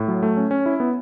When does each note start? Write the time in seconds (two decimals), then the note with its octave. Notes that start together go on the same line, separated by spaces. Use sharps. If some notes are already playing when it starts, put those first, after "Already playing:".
Already playing: A2
0.08 F#3
0.23 A3
0.37 C#4
0.51 C#4
0.66 E4
0.80 B3